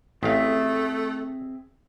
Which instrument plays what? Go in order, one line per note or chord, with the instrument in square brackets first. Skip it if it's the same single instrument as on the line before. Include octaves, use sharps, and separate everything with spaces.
[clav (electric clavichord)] A1 F5 [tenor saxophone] A3 [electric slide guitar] C4 G#4 E5